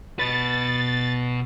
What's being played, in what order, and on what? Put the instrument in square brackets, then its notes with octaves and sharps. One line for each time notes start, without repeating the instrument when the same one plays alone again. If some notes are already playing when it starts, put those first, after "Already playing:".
[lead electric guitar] B2 B4 [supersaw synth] A6